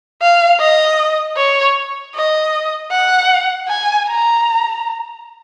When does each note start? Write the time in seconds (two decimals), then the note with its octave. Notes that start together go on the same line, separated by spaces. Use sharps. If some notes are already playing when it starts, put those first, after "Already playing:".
0.22 F5
0.60 D#5
1.37 C#5
2.15 D#5
2.91 F#5
3.68 G#5
4.07 A#5